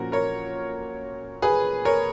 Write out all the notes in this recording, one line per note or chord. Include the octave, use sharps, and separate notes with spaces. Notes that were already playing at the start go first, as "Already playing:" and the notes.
Already playing: A#2 F3 A#3 C#4 F#4 A#4
A#4 C#5
G#4 B4
A#4 C#5